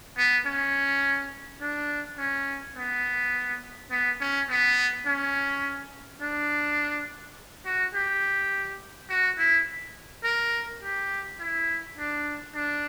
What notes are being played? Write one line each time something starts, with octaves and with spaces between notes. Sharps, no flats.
B3
C#4
D4
C#4
B3
B3
C#4
B3
C#4
D4
F#4
G4
F#4
E4
A#4
G4
E4
D4
D4